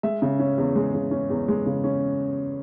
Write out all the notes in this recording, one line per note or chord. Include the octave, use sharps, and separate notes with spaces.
G#3 E5
C#3
C#4
E2
G#3
C#3
C#4
E2
G#3
C#3
C#4